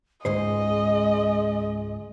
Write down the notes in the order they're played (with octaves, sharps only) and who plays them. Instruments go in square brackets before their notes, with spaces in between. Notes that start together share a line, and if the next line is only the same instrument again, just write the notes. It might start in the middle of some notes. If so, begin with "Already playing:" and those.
[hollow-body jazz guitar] C#2 G#2 C5 [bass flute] G#3 [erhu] D#5